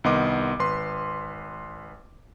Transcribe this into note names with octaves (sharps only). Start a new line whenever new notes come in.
C2 D#3 B3 D#5 C6 D6
G#1 B4 C6